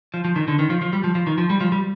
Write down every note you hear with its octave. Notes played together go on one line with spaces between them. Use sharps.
F3
F3
D#3
D3
D#3
F3
F3
G3
F3
F3
D#3
F3
G3
F3
G3